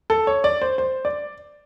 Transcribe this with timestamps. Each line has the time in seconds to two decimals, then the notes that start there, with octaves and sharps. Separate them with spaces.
0.10 A4
0.27 C#5
0.44 D5
0.62 C5
0.78 C5
1.05 D5